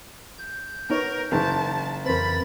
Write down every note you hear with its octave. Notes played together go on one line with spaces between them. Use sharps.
G6
B3 D#4 A#4 C#5
F#1 E3 D#4 A#4 A5
F2 E3 A#4 C5 B5 A6